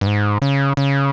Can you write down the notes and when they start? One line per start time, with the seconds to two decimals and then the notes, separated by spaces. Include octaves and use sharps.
0.01 G2
0.07 G#2
0.42 C#3
0.77 C#3